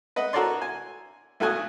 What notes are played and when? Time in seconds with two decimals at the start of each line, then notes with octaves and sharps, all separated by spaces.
0.16 B4 D#5 F#5
0.33 F#4 A4 A#4 C#5 D5 C6
0.62 G#5
1.40 B1 A3 F#4 F#5 G#5 D#6